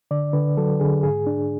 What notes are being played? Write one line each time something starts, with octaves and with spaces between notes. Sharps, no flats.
D3 D5
D3 B4
F#3 A4
D3 G#4
G#2 G#4
D4